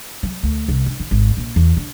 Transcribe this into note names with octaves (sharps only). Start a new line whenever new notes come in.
F#3
D2
C2
D3
D#3
G#1
A#1
E2
D3